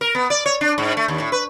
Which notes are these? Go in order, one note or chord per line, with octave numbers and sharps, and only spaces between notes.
A#4
B3
D5
C#5
D4
G#2
A3
D#2
A2
B4